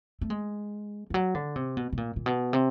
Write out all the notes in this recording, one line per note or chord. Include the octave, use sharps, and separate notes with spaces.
A3
G#3
F3
F#3
D3
C3
B2
B2
A#2
A#2
B2
C3